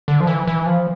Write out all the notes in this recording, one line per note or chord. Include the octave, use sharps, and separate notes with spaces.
D3
F3
E3
E3
F3